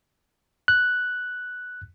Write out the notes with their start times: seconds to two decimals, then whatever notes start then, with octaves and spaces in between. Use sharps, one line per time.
0.68 F#6